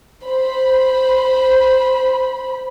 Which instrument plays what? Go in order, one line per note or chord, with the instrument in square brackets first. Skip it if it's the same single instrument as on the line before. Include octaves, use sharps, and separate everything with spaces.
[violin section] C5 B5